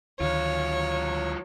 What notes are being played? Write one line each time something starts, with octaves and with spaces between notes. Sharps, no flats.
D2 D#3 F#3 F4 C#5